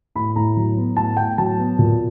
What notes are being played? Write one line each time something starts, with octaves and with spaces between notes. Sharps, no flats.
A2 B5
A2 A#5
F#3
B3
A2 A5
A2 G5
F#3 A5
B3
A#2